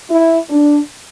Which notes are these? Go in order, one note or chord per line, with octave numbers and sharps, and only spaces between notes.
E4
D4